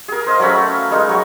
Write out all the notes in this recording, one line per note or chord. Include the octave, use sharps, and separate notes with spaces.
G#4 A#4
C5 D#5 F5
F#3 A3 C#4 B5
F5
G#3 D#4 A#4
F#3 C#6